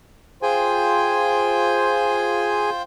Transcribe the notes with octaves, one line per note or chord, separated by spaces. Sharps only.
F4 G#4 C5 G5 G#5